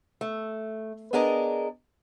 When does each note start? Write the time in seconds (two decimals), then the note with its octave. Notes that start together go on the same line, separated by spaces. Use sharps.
0.21 A3
1.13 B3 D4 G#4 A#4 D5 D#5